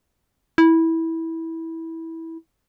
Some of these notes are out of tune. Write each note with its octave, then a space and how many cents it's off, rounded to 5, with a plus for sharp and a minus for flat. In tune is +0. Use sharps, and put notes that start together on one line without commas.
E4 -15